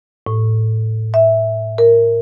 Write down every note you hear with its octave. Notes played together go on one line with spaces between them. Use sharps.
A2
E5
A#4